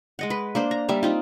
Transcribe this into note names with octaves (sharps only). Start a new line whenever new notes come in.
G#3 D#5 F#5
B4
A#3 D4 C5
A#5
G3 A#3 E5 F5
C4 D#4 F4